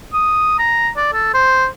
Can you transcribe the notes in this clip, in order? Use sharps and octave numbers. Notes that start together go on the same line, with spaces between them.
D#6
A#5
D5
A4
C5